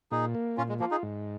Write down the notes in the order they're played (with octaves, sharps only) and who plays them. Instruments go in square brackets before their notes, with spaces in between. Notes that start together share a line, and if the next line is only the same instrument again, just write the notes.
[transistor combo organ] A#2 [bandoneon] D#4 G#4
[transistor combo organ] A#3
[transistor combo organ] A#2 [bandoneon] C#4 F4
[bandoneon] G#3
[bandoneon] F3 A#3 [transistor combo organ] F4
[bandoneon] D#4 G#4
[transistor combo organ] G#2